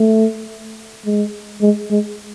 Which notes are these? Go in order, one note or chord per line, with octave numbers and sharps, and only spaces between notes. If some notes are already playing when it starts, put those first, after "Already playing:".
Already playing: A3
G#3
G#3
G#3